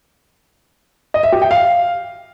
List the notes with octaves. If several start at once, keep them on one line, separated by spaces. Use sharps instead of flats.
D#5
E5
G4
G5
F5